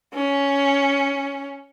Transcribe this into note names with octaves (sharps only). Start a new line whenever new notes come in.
C#4